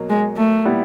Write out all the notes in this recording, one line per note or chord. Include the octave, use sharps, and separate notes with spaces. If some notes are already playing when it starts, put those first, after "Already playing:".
Already playing: B2 F#3 A#3
G#3
A3
A#2 G3 B3 E4